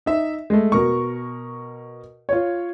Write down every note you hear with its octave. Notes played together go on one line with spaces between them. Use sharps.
D#4 E5
G#3 A3
B2 A#4 C#6
F4 C#5